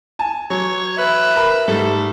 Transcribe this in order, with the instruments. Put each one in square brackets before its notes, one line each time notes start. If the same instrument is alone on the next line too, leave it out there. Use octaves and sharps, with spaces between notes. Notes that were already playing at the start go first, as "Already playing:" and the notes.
[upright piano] G#5 A5
[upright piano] F#3 [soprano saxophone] C#5
[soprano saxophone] B4 [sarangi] E5
[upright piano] A#4 B5
[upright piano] G#2 G3 A3 [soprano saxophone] A4